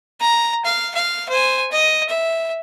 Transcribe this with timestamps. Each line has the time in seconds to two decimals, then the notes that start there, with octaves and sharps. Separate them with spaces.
0.20 A#5
0.65 F5
0.95 F5
1.29 C5 G#5
1.72 D#5
2.09 E5